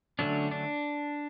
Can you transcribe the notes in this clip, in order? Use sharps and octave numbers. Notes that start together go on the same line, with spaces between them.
D3 F#3 A3 C#4 D4
D4